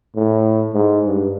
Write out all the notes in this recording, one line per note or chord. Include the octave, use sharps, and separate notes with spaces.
A2
G#2
G2